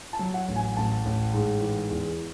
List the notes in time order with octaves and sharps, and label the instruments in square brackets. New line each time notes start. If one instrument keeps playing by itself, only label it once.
[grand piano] A5
F#3
F#5
A1
G#5
A1 A5
A1
G#2
E3
E2